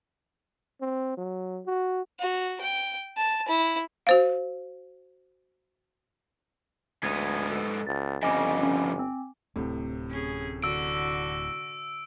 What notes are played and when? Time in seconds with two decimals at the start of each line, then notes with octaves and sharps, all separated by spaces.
0.81 C4
1.17 F#3
1.66 F#4
2.20 F#4
2.61 G5
3.17 A5
3.48 E4
4.07 F#4 C5 F5
7.03 D2 G#2 B3 G#6
7.52 A4
7.87 C#2 A6
8.23 G1 F2 C#3 D#5 G#5 D6
8.63 C#4
8.99 C4
9.56 D1 A2 C3
10.11 C#4 G#4
10.63 D3 F#4 E6 D7